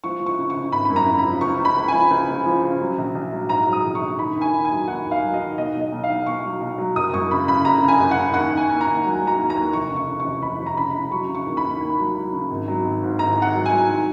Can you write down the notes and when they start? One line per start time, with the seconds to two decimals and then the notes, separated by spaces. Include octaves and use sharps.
0.04 F3 C#6
0.20 F3
0.26 C#6
0.38 C#3
0.50 C#3 C#6
0.72 G#1 B5
0.85 F#2 B5
0.96 A#5
1.06 C#3
1.18 B5
1.24 F3
1.41 C#2 C#6
1.58 C#2
1.65 B5
1.76 C#2
1.88 F3 G#5
2.11 C#2
2.29 C#2
2.46 F3
2.63 C#3
2.81 F#3
2.98 A#1
3.15 A#1
3.32 F#3
3.49 G#2 A#5
3.66 F#3
3.73 D#6
3.84 A#1
3.95 C#6
4.01 A#1
4.19 D#3 B5
4.36 D#2
4.41 G#5
4.54 D#3
4.65 G#5
4.71 F#3
4.87 D#2 F#5
5.05 D#2
5.11 F5
5.23 F#3
5.34 D#5
5.40 D#3
5.58 B1 D#5
5.75 B1
5.80 D#5
5.92 B1
6.04 F5
6.10 B1
6.26 B1 C#6
6.44 F#3
6.61 B1
6.78 F#3
6.96 F#1 D#6
7.13 F#2 C#6
7.31 C#3 B5
7.48 C#3 B5
7.65 F#1 A#5
7.82 C#3
7.88 G#5
8.00 F#1
8.11 F#5
8.17 C#3
8.34 D#2 F#5
8.51 D#2
8.57 G#5
8.69 D#2
8.81 A#5
8.86 D#2
9.04 F#3
9.21 F#3
9.27 A#5
9.38 D#2
9.50 A#5
9.56 D#2
9.73 F1 C#6
9.90 C#3
9.96 C#6
10.08 C#3
10.20 C#6
10.25 F1
10.42 F1 B5
10.60 F1
10.66 A#5
10.77 C#3 B5
10.94 C#3
11.11 F#3 C#6
11.29 C#3
11.35 C#6
11.46 D#2
11.57 B5
11.64 D#2
11.81 D#2
11.98 F#3
12.15 F#3
12.33 C#3
12.50 G#1
12.68 F#3
12.84 G#1
13.03 G#2
13.19 G#1 A#5
13.37 G#1
13.42 F#5
13.54 F#3
13.66 G#5
13.71 F#3
13.88 D#3